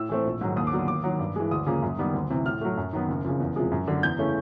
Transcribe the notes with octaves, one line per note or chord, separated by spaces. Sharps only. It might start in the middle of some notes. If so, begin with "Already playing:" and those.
Already playing: A2 E6
E3 A3 C4
A#1
G#2 D#3 F#3
D#2 D#6
D6
D3 F#3 B3
D#2 D6
D#3 F#3
G2
E3 G#3
D2 D#6
C#3 F3 A#3
F#2
D#3 G3 B3
D2
C3 E3
A2 F6
F#3 A3
F#2
D#3 F#3 B3
F#1
F2 C#3
E2
C3 F3 G#3
F#2
D3 F#3
E2 G6
C#3 E3 A3 C#4